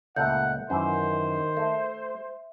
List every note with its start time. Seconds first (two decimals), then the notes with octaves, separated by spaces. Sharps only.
0.16 C#2 A#2 A3 E5 F#5 G6
0.70 F#2 D#3 E3 C5
1.57 A3 E5